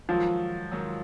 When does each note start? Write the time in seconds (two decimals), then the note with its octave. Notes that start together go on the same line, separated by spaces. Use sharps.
0.08 G#2 D#3 F3 F#3
0.71 G#2 D#3 F#3